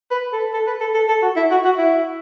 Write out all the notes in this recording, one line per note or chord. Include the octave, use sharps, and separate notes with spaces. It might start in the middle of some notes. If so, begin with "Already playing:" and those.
B4
A4
A4
B4
A4
A4
A4
F#4
E4
F#4
F#4
E4